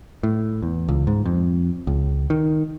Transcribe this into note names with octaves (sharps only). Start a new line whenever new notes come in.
A2
E2
C#2
G#2
F2
C#2
D#3